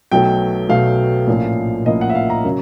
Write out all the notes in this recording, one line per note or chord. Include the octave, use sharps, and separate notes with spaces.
B1 B2 F#3 A3 G5
B1 B2 F#3 A3 F5
A#1 A2 F3 A#3 C#4
A#1 A2 F3 A#3 C#4 D#5
F#5
E5
F5
A#5
C#3 F#3 A#3